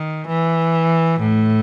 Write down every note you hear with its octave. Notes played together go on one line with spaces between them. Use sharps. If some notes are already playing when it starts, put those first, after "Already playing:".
Already playing: D#3
E3
A2